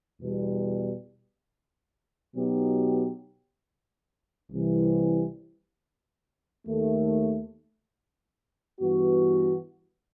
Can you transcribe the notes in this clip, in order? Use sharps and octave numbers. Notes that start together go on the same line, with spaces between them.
E2 B2 G3
B2 F#3 B3 D#4 G4
C2 C3 E3 G3
D#2 D#3 A3
G2 E3 B3 F#4